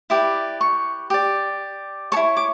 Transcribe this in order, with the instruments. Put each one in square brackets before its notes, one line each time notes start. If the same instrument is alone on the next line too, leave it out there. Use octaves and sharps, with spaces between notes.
[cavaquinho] E4 G4 B4 D5
C#6
G4 D5
A4 C#5 C#6
E4
D6